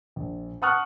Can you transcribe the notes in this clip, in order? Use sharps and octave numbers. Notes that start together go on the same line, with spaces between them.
A#1
F#5 A5 C#6 D#6 F6 F#6